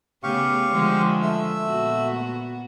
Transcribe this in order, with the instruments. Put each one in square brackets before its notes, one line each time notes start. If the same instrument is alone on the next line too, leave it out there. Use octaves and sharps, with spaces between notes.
[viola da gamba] C#3 A3 B3 [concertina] G4 F5 C#6
[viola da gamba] D3 F3 G#3
[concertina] A3 E5 E6
[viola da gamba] A#2 B3 F#4